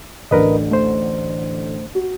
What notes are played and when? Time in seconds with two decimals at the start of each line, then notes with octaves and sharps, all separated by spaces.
0.31 A1 D2 D3 A#4 B4 D#5
0.71 A3 C5
1.95 F#4